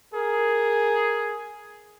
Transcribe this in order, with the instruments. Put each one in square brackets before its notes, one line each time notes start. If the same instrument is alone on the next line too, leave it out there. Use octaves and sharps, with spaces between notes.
[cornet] G#4 [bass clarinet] A#4